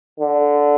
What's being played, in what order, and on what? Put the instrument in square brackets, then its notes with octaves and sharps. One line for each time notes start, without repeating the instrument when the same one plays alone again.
[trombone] D3